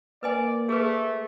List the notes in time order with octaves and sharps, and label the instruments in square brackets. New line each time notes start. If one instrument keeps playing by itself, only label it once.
[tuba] A#3 [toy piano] B4 D#5 G#5 [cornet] D5
[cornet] A3 [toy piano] G#4 B4